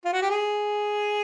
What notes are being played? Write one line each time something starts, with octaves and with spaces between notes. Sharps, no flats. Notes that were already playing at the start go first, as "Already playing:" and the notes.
F4
F#4
G4
G#4